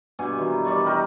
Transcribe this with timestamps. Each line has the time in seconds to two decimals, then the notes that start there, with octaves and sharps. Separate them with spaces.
0.19 G2 B2 G#5
0.38 D#3 E3
0.65 G3 D5 C#6
0.85 D#4 A#4 G5 B5